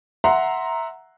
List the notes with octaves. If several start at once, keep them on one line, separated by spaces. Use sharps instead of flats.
E5 F#5 A#5 C6